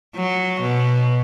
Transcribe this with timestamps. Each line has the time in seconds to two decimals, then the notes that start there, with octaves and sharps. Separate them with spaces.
0.16 F#3
0.62 B2